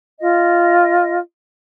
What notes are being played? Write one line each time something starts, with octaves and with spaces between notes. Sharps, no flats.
F4 D#5